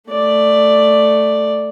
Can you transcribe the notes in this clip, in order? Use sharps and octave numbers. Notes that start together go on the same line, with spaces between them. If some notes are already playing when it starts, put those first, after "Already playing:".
A3 D5